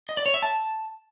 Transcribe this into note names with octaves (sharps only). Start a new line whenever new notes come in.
D#5
D5
C#5
E5
A5